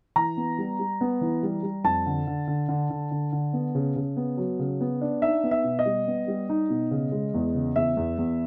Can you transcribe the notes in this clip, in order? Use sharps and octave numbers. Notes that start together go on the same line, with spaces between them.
E3 A#5
B3
G3
G3
B3
E3
G3
G3
F2 A5
D3
D3
D3
D3
D3
D3
D3
B3
C#3
C#3
B3
F#3
C#3
B3
D4
D#4 E5
B3
E5
B2
D#5
G3
B3
G3
D#4
B2
C#3
G#3
E2
C#3
E2 E5
E2
E2